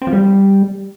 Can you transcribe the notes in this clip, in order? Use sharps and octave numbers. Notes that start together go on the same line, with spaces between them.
C4
F3
G3